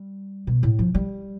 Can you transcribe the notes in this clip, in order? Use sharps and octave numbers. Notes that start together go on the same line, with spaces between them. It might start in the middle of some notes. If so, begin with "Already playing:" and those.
Already playing: G3
B2
A2
F3
G3